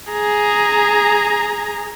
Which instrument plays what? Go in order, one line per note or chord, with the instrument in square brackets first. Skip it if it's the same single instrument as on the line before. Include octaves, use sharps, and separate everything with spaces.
[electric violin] G#4 A#5